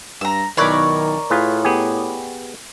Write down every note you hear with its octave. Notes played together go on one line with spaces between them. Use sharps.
G2 A#5 E6
B1 D#3 E4 A#4 B4 C#5 D5
A2 F4 G#4 B4
B3 G4 G#4